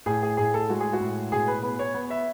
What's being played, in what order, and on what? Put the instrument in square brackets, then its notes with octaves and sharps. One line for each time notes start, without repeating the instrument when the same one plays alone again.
[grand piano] A2 G#4
G#4
A2 G#4
A4
G#3 F#4
G#4
F#4
A2
B2 G#4
B4
B3 B4
C#5
B3
E5